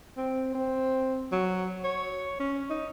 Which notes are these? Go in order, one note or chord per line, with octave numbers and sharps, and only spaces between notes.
C4
C4
F#3
C#5
C#4
D#4